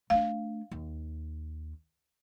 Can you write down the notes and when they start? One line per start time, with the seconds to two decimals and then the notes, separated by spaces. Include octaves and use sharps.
0.10 A3 D4 F5
0.71 D#2